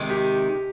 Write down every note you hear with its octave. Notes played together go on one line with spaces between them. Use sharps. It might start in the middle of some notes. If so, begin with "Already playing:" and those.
Already playing: C3 D#3 G#3
G4